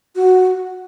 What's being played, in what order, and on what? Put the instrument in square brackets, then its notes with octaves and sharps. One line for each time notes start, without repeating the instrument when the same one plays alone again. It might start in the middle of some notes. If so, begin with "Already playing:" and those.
[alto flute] F#4